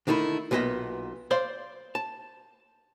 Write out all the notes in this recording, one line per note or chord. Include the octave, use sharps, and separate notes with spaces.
D3 D#3 A3 D#4 E4
B1 A#2 B3 G#4 D#5 E5
C5 D5 F5 C6
A5